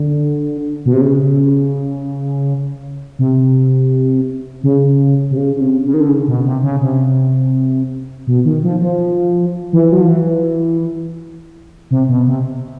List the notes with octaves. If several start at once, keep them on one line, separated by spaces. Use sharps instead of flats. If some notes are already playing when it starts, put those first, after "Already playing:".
Already playing: D3
B2
C3
C#3
C3
C#3
C3
C#3
C#3
C3
C#3
D#3
D3
C#3
B2
C3
C#3
C3
B2
D#3
F3
F3
E3
F#3
F3
E3
C3
B2
C3